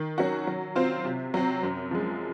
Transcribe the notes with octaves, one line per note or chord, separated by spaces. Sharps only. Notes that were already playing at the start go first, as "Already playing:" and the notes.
Already playing: D#3
F#3 C#4 F#4
F#3
C4 F4 C5
C3
F#3 C4
F#2
F3 G#3